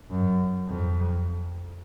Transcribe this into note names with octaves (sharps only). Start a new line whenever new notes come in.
F#2
F2